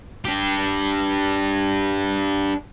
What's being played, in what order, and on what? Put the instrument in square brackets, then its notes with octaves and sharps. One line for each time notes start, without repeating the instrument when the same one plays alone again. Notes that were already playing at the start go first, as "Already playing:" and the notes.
[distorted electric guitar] D4 G4